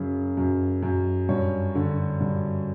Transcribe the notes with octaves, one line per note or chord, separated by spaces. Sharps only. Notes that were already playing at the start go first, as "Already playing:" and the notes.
Already playing: F#2 C#3
F#2
F#2
G2 C#5
D3
G2